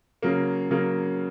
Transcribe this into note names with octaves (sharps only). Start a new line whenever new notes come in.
C#3 F#3 A#3
C#3 F#3 A#3